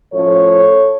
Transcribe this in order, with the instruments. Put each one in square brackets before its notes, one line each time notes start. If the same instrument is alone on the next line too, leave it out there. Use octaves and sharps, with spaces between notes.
[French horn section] A2 F3 A3 C#4 A4 C#5